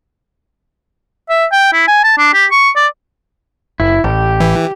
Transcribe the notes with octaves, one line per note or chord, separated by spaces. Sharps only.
E5
G5
E4
G#5
A5
D4
G4
C#6
D5
F#1 E4
A1 G4
E3